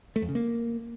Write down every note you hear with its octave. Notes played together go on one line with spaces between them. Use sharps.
A3
F2
C#3
A#3